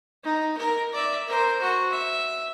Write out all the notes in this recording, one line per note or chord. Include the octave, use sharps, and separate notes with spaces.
D#4
A#4
D5 E5
A#4 C5
F#4
E5